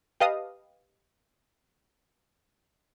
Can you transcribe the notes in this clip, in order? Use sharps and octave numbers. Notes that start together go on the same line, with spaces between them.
G4 B4 D#5 F5 A5 D#6